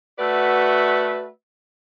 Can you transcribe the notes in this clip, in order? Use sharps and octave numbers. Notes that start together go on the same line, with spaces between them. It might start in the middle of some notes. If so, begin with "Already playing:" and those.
A3 F#4 B4 D5 E5 F#5